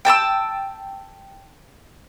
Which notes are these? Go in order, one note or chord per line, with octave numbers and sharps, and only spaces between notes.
G5 A5 D6 E6